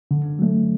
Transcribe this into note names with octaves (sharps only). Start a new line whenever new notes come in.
D3
F#3 A3